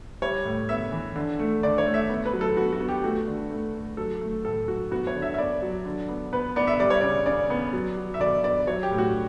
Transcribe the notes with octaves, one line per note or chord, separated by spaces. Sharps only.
G3 C#5
A2
B3 E5
E3
D3
A3
D3 D5
C#5
A3
E5
B3
B4
F#3
A4
B3 F#4
F#4
B3
G4
A3 F#4
D3
A3
A3
F#3 A4
A3
A2 A4
F#3 F#4
B3 F#4
C#5
D3
E5
E5
B3 D5
F#3
D3
B3
B3 B4
B3 D5
E5
G3 D5
C#5
C#3 D5
C#3 D5
B3
F#3
F#3
E5
B2 D5
B3 D5
F#3 C#5
G4
A2
F#4